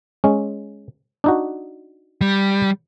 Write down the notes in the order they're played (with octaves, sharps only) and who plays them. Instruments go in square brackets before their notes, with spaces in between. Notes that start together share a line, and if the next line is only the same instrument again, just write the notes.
[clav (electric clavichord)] G#3 C#4
D4 D#4 F#4
[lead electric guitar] G3